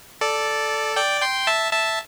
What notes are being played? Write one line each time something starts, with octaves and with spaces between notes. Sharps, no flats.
A4 D5
D5 G5
G5 C6
E5 A5
E5 A5